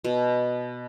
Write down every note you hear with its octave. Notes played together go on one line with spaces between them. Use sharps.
B2